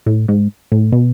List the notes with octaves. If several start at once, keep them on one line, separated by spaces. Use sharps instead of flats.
A2
G#2
A2
B2